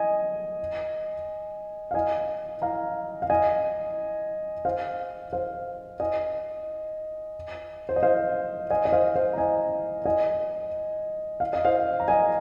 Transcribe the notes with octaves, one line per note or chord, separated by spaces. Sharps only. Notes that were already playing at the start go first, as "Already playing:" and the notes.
Already playing: D#5 G#5
F5
D#5 G#5
F5 A#5
F5
D#5 G#5
C5 F5
C5 F5
D#5 G#5
C5
D#5
C5 F5
D#5 G#5
D#5
C5 F5
C5 F5
A#5
D#5 G#5
D#5 G#5
F5
D#5
C5 F5
A#5
D#5 G#5